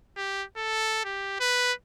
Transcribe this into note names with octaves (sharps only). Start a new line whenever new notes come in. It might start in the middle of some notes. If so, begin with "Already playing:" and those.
G4
A4
G4
B4